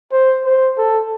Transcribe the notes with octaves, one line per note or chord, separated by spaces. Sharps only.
C5
C5
A4